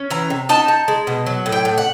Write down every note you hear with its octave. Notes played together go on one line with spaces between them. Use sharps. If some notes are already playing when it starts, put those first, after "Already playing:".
Already playing: C#4
E3 A#5
C3
D#4 A5
D#4
G#3
B2
F#3
A2
G5
A2
F#5